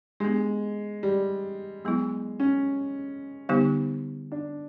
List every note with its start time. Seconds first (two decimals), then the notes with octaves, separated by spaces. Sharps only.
0.20 G#3 B3 D4 G4
1.03 G3
1.84 F#3 G#3 B3 E4
2.40 C#4
3.49 D3 G3 B3 D#4 G4
4.32 D4